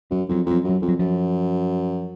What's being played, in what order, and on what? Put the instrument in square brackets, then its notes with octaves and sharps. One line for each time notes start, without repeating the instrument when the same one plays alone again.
[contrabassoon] F#2 [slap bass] F#3
[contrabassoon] F2 [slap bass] F#3
[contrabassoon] F2 [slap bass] F#3
[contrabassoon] F#2
[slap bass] F#3
[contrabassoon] F2
[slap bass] F#3
[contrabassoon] F#2 [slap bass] F3